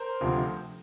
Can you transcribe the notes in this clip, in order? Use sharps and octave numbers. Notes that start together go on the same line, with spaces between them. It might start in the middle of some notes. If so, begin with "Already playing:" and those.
Already playing: A#4 C5
D2 C3 F3